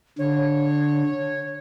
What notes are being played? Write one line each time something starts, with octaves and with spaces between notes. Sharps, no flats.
D3 C#5